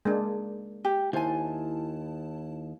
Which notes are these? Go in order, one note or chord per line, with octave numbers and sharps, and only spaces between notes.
G#3 A#3 D4
G4
D#2 E4 C5 G#5 A5